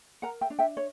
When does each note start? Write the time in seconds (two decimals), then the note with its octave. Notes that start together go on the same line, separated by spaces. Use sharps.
0.22 A#4 F#5 A#5
0.41 E5 G5
0.50 D4
0.59 E5 G5
0.77 C#5